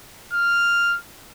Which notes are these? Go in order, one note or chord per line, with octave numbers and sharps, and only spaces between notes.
F6